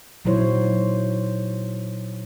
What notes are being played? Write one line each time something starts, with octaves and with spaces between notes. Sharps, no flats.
A#2 F#3 D#4 E4 C5 C#5